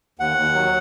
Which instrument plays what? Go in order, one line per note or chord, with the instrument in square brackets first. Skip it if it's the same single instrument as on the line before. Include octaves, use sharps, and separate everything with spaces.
[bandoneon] D#2 F#5
D#2
F#3